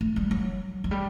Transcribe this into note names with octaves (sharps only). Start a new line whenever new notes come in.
A3
G3
F#3
F#3
G3